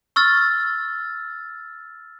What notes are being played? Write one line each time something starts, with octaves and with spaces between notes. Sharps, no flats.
C#6 E6 F6 A6